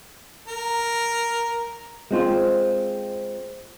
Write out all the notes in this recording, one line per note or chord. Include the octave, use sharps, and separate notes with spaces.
A#4
G#3 C4 F4